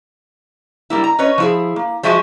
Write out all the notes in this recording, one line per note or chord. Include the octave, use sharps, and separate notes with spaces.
G3 A#3 E4
A#5
C#4 B4 C#5 D#5
F3 E4 G#4
A#3
F3 G#3 F#4 E5 G#5 A5